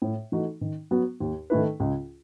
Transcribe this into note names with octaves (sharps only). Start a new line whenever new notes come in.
A2
E3 A3 D#4 F#4
D#3
F#3 B3 F#4
D#2
D#3 A3 E4 B4
C#2